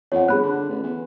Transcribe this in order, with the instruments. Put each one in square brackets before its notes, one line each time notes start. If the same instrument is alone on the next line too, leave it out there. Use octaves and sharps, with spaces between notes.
[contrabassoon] F2 [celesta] C#5 F#5
[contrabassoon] G1 [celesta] G#4 B5 F#6
[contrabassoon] D3
A1
E2